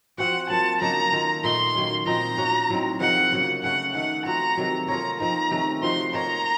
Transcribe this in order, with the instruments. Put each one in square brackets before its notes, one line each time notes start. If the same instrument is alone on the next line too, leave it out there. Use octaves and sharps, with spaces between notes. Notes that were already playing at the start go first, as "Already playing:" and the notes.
[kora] F3 C4 F#4 [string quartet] F#5
[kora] F#3 A#3 F4 [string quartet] A5
[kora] C#3 F#3 A#3 D#4 [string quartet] A#5
[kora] D#3 A#3 F4 A4
[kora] A#2 A3 D#4 [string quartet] C6
[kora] D#3 F#3 A#3 C#4
[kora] A#2 F3 C4 D#4 [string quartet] A#5
[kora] A#3 C#4 F#4
A2 F#3 C4 D#4
[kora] C3 F3 A#3 D#4 [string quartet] F#5
[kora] C#3 F#3 A#3
[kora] C#3 A3 C#4 [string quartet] F#5
[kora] D#3 A3 D#4 [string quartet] F#5
[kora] F3 C4 F#4 [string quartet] A#5
[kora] C3 D#3 F#3
[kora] A#3 F4 A4 C#5 [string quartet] A#5
[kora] F3 C4 D#4 [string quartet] A#5
[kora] C3 D#3 A3 C#4
[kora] F3 C4 D#4 F#4 [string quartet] C6
[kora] A#3 D#4 A#4 C#5 [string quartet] A#5